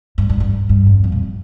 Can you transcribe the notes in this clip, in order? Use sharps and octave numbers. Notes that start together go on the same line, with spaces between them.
G2
G2
G2
G2
F2
F2
A#2